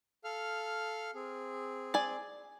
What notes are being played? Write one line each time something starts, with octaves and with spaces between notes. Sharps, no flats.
A4 F5 F6
C4 G#4
D5 G#5